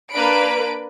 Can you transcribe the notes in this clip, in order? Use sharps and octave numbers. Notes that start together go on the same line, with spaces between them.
A#3 D4 B4 B5 D7